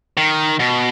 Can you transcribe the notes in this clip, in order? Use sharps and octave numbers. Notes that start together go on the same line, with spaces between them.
D#3
B2